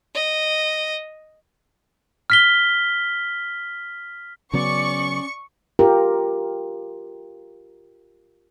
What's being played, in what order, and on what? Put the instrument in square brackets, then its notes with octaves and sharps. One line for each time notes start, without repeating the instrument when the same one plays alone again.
[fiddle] D#5
[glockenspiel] F6 B6 G7
[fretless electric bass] C#3 F#3 B3 [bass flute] C#4 [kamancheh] D5 [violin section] C#6
[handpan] F4 G4 A#4